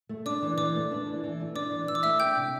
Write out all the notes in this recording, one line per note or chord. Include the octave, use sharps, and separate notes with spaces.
A3
D4 D5 D6
E3
E3 D5 D6
A3
D4
E3
E3
A3
D4 D5 D6
E3
E3 E6
D6
A3 E5 E6
D4 G5 G6
C3